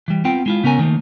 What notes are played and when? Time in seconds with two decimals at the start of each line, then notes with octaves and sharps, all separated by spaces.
0.08 E3 G3
0.25 B3 C4 F4 G5
0.46 G#3 E4 F4
0.64 C#3 B3 C#4 A#4 G#5
0.79 D#3 A3 A#3